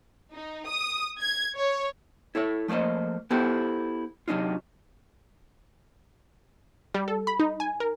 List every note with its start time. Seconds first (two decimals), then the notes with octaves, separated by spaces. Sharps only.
0.33 D#4
0.68 D#6
1.19 G#6
1.55 C#5
2.35 E4 A4 C#5 E5
2.68 F3 A3 A#3 C5 D#5
3.30 B3 E4 G4 A4 C5
4.28 C3 F#3 D4 D#4 F4
6.94 G3
7.08 A4
7.27 B5
7.39 D#4
7.60 G#5
7.80 A#4